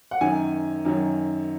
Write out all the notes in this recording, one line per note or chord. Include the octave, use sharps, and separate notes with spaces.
F#5
F#2 D#3 F#3 G#5
F#2 D#3 F#3